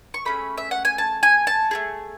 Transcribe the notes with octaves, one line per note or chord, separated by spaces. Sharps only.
C#6
A3 C#4 G#4 B5
E5
F#5
G#5
A5
G#5
A5
A3 E4 G#4